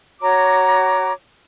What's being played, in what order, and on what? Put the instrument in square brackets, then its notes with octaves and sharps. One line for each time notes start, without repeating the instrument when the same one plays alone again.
[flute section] F#4 C#5 A#5 D6